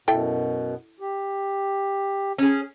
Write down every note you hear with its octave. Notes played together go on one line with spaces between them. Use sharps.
F#2 B2 E4 A4 G5
G4
C#4 G#4